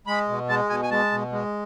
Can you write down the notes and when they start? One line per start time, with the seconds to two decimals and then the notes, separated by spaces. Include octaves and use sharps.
0.07 G#3 B5
0.28 B2
0.49 G#3 A5
0.69 B2 G#5
0.83 G#5
0.91 G#3 A5
1.11 B2
1.32 G#3